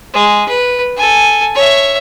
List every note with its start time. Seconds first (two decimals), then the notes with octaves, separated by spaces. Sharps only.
0.14 G#3
0.48 B4
0.97 A4 G#5
1.55 C#5 E5